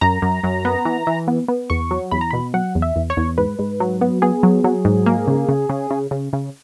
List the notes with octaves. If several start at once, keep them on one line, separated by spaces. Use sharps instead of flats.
F#2 A#5
F#2
F#2
B3
E3
E3
B3
B3
E2 C#6
F#3
E2 B5
A#5
B2 B5
F#3 F#5
E2
E5
E2
C#5
E2
G#2 B4
G#2
F#3
B3
B3 G#4
F#3
F#3
G#2
A#3
C#3
C#3
C#3
C#3
C#3
C#3